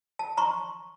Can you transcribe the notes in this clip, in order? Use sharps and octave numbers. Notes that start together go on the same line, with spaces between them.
A5
A#5 C6 C#6